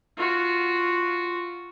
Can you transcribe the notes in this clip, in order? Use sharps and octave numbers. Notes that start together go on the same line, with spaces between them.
F4 F#4